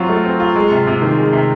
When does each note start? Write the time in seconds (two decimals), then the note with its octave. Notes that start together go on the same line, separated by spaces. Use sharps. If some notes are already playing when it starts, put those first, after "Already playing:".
Already playing: F#3 C4 F4
0.09 A3
0.25 C4
0.40 F4
0.56 G#3
0.71 C3
0.87 C3
1.02 D#3
1.18 G#3
1.33 C3